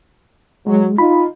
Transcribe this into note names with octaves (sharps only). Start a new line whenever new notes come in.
F#3 G#3
D#4 F4 B5